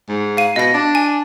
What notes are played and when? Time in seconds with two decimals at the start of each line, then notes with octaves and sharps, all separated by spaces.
0.08 G#2
0.37 F5 D#7
0.56 B2 D#5 A#6
0.74 D4
0.95 G#5